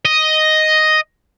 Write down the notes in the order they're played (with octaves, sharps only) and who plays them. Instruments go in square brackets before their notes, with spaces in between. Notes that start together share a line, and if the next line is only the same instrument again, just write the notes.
[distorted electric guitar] D#5